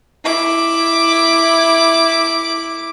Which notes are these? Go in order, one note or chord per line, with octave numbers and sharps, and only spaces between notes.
E4 D6